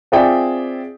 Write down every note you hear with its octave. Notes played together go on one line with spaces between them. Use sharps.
C4 F4 G#4 D5 E5 G5